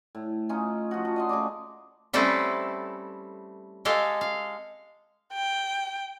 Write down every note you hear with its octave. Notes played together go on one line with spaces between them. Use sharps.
A2
C#4 D#4 F4
F3 F#4
F3
D#5 F#5 C6
C#3 A3 D5 D6
G3 A3 C4 C#4 E4 A4
G#3 G4 A4 F5
F5
G5